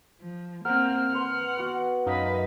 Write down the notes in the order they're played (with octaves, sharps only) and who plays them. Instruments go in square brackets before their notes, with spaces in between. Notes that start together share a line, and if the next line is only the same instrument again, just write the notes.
[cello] F3
[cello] A#3 C4 [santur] A#4 F#5 [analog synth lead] F6
[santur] B4 C6 [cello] F#5
[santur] B3 F#4
[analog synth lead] F#2 [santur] D#4 F5 [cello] B4 D#5